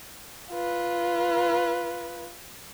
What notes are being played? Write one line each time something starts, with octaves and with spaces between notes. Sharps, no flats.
F4 B4